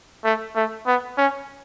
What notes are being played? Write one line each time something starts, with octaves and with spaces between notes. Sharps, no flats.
A3
A3
B3
C#4